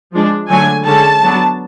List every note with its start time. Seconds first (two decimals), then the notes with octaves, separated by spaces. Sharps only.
0.13 F3 G#3 D4
0.49 D3 F#3 A3 G#5
0.86 D3 G#3 C#4 A5
1.23 F#3 B3 D4